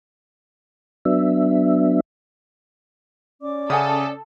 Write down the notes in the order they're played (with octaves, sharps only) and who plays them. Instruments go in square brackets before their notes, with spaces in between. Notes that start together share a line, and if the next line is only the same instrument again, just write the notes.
[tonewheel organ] F#3 B3 D4 E5
[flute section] C#4 D5 D6
[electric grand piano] C#3 D#6 [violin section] A4 [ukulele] E5 F#5 G#5